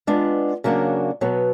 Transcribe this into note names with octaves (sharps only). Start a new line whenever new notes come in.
G#3 B3 D4 F4
C#3 F#3 A#3 D4 F#4
B2 F#3 B3